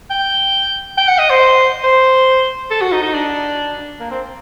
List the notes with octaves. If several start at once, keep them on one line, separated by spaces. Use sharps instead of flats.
G5
G5
F#5
D#5
C5
C5
A4
F#4
D#4
D#4
D4
A#3
C4